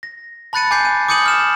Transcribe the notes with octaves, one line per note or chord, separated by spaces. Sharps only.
A#6
A5 B5 F#6 A6 C#7 D#7
G#5 D6 G6 C7
D#7
D6 D#6 G6 C#7 D#7 F#7
F6 E7